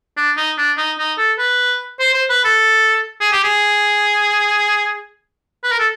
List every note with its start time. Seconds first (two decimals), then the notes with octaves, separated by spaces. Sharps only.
0.17 D4
0.37 D#4
0.58 D4
0.77 D#4
0.98 D#4
1.18 A4
1.38 B4
1.99 C5
2.14 C5
2.30 B4
2.45 A4
3.21 G#4
3.32 G4
3.44 G#4
5.64 B4
5.72 A#4
5.80 A4